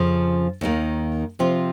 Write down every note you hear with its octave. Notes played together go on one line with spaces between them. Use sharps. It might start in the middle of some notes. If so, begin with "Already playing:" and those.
Already playing: F2 C#3 F3
D#2 D#3 A#3
C3 F3 C4 F4